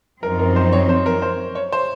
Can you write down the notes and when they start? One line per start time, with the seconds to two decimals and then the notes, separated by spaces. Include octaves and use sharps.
0.23 F#2 F3 C4 D#4 A#4
0.39 A#4
0.56 C5
0.72 C#5
0.89 C5
1.06 A#4
1.22 C5
1.55 C#5
1.72 C5